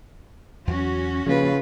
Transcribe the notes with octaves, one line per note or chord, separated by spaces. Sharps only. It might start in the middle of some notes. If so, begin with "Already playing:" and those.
E2 F#3 C#4 F#4
C#3 F3 A#3 F4 B4